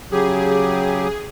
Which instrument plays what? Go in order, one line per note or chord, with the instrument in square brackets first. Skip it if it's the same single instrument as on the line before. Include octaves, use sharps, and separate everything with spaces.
[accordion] C#3 F#3 G4 [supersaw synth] G#4